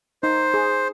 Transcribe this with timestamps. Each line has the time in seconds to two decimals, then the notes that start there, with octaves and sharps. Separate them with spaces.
0.23 D#4 C5
0.54 G#4